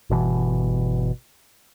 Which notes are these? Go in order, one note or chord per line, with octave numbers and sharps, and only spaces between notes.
G1 B2 E3